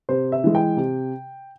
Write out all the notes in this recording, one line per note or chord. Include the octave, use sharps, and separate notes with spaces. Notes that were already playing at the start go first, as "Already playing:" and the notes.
C3 C5
E5
E3 G#3
G5
C3